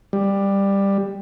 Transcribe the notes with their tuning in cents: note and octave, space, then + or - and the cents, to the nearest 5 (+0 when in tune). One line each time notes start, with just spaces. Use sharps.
G3 +10